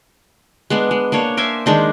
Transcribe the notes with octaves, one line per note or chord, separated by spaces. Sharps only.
G#3 B3 D4
G#3
A#3 D4 C#5
A#4 C5 E5 G#5
D#3 G#3 D4 D#4